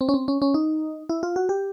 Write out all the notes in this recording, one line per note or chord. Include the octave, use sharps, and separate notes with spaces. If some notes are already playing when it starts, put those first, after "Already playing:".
C4
C#4
C4
C#4
C#4
D#4
E4
F4
F#4
G4